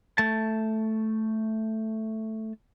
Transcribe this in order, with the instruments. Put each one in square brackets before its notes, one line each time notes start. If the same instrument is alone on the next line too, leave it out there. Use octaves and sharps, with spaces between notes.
[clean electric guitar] A3 A5